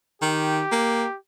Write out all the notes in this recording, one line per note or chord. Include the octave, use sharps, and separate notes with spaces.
D#3 G4
A#3